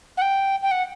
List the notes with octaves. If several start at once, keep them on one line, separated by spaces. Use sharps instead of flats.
F#5
G5
G5
F#5